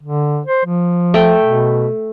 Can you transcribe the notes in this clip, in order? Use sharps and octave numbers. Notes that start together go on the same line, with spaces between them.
D3
C5
F3
A3 G5
B2